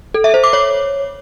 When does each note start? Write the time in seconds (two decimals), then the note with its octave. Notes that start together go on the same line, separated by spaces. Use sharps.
0.14 A4
0.24 E5
0.34 C5
0.44 D6
0.53 C#5